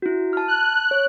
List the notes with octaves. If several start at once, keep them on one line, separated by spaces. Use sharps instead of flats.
E4 F#4
A5 F6
F#6
C#5